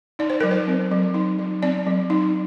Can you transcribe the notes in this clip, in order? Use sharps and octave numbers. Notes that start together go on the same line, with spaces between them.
D#4 D5
C5
F#3 A#4
C5
C4
F#3
D#4
F#3
C4 D5
F#3
D#4